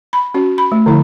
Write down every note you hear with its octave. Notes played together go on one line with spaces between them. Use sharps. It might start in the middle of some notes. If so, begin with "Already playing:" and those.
B5
C#4 F#4
B5
A3
D3 F3 E4